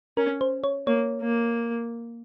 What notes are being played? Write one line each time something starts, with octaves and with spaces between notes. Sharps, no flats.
C#4 A#4
C5
C#5
A#3 C#5
A#3